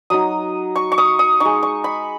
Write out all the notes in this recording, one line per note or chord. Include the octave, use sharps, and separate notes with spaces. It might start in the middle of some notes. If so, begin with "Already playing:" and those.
F#3 D#4 D#6
C#6
C#6
D#6
D#6
G#3 D#4 C#6
C#6
B5